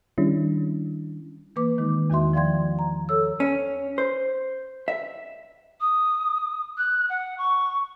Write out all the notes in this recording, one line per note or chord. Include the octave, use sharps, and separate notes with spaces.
D#3 G3 C#4 D4 E4
E3 A#3 B4 D6
D#3 G#3 D#4
E2 D#3 F#4 E5 C6
F3 D5 F5 G5 C6 G#6
A#5
A4 C#5 E6
C#4
C5
E5
D#6
F#6
F#5
C#6